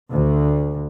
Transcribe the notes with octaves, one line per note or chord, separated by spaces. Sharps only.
D2